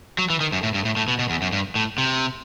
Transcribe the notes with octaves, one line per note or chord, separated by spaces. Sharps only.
F#3
E3
D#3
F#2
A2
G2
A2
A2
B2
B2
E2
F#2
G2
A2
C3